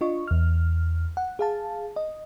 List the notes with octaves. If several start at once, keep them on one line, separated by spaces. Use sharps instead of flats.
D4 F4 D#5 C#6
E2 F6
F#5
G#4 F5 A5
D#5